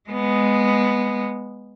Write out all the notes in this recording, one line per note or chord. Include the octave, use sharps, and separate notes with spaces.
G#3 B3